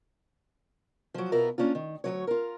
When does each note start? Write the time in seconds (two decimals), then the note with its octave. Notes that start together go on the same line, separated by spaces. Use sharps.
1.14 F3 F#3
1.32 B2 E4 F4 A#4
1.58 A#3 C#4 D4 F4
1.75 D#3
2.04 D2 C#3 F#3 C#5
2.27 F4 A#4